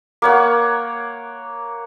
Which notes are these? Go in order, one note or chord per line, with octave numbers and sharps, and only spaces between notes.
A#3 C#5 F#5